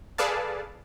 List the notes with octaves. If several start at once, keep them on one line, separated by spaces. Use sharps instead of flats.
G#4 A4 B4 D5 F5 A5